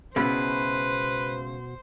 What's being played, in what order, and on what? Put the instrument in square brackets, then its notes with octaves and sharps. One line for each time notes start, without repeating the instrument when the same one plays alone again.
[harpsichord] C#2 E4 [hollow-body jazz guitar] B2 [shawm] B4 [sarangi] C5